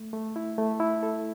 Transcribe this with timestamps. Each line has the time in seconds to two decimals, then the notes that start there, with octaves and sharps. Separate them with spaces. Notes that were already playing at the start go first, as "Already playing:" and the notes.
Already playing: A3
0.13 A3
0.36 E4
0.58 A3
0.80 E4
1.03 A4